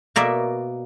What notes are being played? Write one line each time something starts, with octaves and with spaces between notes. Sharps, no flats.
B2 A#3 D5 E5